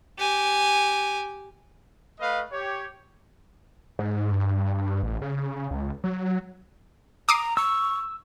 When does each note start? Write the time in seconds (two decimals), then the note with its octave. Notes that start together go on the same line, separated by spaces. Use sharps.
0.19 G4 G#5
2.20 A3 B4 D#5 F5
2.52 G4 C#5
3.99 G#2
4.32 G2
5.03 A1
5.22 C#3
5.71 C#2
6.04 F#3
7.29 A#5 D6 D#6 C7
7.57 C#6 E6